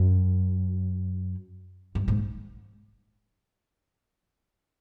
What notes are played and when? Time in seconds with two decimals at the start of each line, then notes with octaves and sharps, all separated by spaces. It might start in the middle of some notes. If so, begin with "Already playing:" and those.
Already playing: F#2
1.95 G2
2.08 G#2